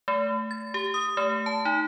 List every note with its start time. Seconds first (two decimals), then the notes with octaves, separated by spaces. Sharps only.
0.08 A3
0.51 A6
0.74 G4
0.94 D#6
1.17 A3
1.46 A5
1.65 D#4